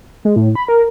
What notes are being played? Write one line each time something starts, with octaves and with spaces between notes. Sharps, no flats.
G#3
A2
B5
A#4